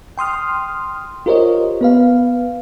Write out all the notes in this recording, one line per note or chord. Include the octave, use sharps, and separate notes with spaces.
G5 C6 D#6 F6
F4 G4 A#4 C5 C#5 D#5
B3 B4 F5